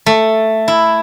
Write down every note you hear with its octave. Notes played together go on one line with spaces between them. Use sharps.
A3
E4